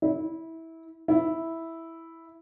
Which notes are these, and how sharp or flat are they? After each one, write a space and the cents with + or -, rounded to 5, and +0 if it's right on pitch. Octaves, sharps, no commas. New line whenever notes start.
E4 -20
E4 -5